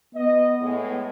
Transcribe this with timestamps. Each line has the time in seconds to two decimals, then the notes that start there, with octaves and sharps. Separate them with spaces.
0.15 B3 D#5
0.61 A2 G#3